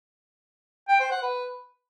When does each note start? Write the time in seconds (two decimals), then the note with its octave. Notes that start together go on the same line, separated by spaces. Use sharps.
0.88 G5
1.00 C5
1.11 F#5
1.22 B4